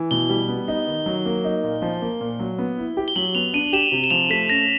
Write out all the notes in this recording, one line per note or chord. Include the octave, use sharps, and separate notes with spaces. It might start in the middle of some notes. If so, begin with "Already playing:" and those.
Already playing: E3
B2 G7
G3
B3
D#4
D#3
F#3
A#3
D#4
A#2
F3
A#3
A#2
F#3
B3
E4
G4
G7
F#3 F#7
B3 F7
D4 D#7
G4 E7
C3
E7
F3 F7
A3 B6
C#4 A#6